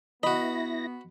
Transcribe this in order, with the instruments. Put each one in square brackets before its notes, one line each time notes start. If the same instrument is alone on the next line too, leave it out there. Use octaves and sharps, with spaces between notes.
[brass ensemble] B3 [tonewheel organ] E4 A#6 [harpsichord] F#4 B5 [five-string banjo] D#5